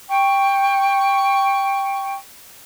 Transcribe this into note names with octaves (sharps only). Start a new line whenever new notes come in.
G5 C#6